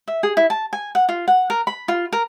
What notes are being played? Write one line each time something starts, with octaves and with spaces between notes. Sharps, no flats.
E5
G#4
E4
A5
G#5
F#5
F4
F#5
A#4
B5
F4
A#4